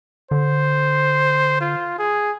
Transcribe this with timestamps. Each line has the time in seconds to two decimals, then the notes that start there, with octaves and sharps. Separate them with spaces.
0.31 D3 C5
1.61 F4
1.99 G#4